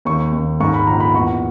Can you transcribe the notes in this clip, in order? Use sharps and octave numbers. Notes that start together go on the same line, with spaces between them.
D#2 C#6
D#2
G#2 C#6
B5
A#1 A#5
B5
E2 C#6